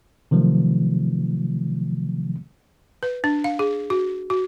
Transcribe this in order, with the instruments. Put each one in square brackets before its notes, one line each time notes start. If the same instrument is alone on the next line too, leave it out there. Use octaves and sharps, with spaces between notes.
[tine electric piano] C3 D#3 F3 F#3 A3
[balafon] B4
D4
F5
G#4
F#4
F#4